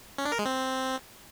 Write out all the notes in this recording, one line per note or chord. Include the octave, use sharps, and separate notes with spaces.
C#4
D4
A#4
G#3
C4